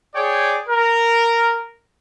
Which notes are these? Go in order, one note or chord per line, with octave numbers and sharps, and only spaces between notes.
G#4 C#5 D5 G5
A#4